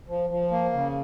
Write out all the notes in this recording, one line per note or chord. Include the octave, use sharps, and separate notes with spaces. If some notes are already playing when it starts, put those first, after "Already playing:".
F3
F3
A#3
C#3